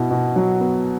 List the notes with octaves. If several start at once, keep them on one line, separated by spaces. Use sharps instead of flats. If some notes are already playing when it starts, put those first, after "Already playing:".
Already playing: B2 E4
B2
F#3
B3